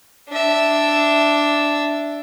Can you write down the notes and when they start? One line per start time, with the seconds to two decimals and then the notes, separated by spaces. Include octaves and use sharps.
0.29 D4 E5